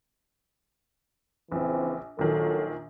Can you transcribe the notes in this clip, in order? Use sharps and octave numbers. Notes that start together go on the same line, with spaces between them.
A#1 C#3 E3 C4
A#1 A#2 D#3 F#3 A4